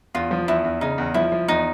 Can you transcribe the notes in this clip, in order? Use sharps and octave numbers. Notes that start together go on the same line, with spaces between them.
E2 F4
F3
E2 E4
E2
C#3 D#4
E2
F3 E4
F3
E2 D#4